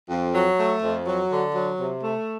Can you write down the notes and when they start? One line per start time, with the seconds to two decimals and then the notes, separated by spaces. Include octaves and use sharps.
0.10 F2
0.35 F#3
0.59 A3
0.83 F2
1.07 F#3
1.31 D3
1.55 F#3
1.79 C3
2.04 A3